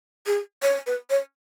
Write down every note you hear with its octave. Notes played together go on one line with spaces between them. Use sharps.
G#4
C#5
B4
C#5